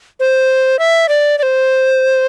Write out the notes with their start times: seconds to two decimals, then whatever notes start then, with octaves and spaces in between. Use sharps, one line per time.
0.20 C5
0.79 E5
1.09 D5
1.38 D5
1.43 C5